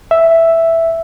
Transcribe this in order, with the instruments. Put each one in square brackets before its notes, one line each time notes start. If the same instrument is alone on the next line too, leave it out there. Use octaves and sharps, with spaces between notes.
[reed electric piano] E5